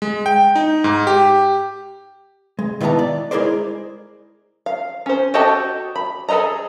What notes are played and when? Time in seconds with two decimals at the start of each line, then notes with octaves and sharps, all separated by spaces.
0.02 G#3
0.26 G5
0.55 D#4
0.84 G#2
1.07 G4
2.59 G#3
2.81 D#3 E3 B3 F5 A5 A#5
2.99 D5
3.31 G#3 E4 G#4 A#4 C5 D5
4.66 F5
5.06 C#4 C5
5.34 F#4 G4 A4 D#5 A5
5.96 B5
6.29 G#4 A4 B4 D#5 A#5